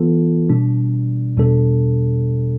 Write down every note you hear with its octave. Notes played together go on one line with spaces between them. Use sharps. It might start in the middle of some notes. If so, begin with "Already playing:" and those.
Already playing: E3 B3 F4 A4
B2 G3 D4
E2 B2 G3 D4 A4